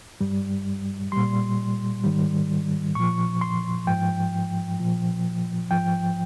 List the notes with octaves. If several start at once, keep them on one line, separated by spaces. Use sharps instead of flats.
G2 G3
A#2 G3 C6
G#2 D#3 G3
A#2 F3 C#6
C6
G#2 F3 G5
A#2 F3
G#2 F3 G5